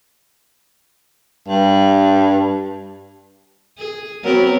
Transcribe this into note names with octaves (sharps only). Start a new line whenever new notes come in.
G2
G#4
F#3 B3 C4 A#4